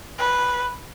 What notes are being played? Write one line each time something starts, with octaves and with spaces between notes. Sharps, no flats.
B4